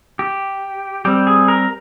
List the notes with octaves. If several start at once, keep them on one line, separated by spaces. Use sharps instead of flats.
G4
G3 C4 G4
G#4
A#4